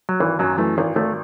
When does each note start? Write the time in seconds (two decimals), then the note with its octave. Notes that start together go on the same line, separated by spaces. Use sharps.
0.09 F#3
0.20 G#1 E3
0.39 F#2 F#3
0.58 E3 A3
0.78 G#1
0.96 G#1 A3